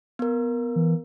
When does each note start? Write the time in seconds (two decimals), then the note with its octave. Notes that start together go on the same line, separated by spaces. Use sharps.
0.19 B3 A#4
0.76 E3